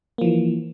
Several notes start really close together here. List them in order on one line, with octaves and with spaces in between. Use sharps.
A#3 F3 E3